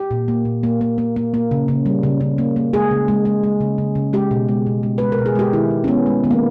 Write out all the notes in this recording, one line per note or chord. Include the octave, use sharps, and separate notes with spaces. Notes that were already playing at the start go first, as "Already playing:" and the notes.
Already playing: G4
A#2
A#3
A#2
A#3
A#3
A#3
A#3
A#3
C#3
C#3
G3
C#3
C#3
A#3
A#3
G#3 G#4
C#3
G#3
G#3
G#3
C#3
C#3
C#3
G#3 G4
B2
G#3
B2
G#3
G#3 B4
A#4
B2
G#4
G#3 G4
D#3 E4
G#3
C#4
G#3 B3
G#3
D#3 B3
A#3